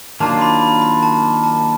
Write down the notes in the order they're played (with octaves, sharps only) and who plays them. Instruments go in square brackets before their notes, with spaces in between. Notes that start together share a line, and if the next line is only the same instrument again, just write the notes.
[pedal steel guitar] D#3 F#3 A#3 D4 F4 [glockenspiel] A5
[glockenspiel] B5
B5
B5
A5
A5